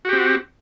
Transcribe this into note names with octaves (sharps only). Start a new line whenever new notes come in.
C4 F#4 G4